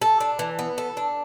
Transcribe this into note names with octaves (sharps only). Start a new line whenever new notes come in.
A4
D4
E3
B3
A4
D4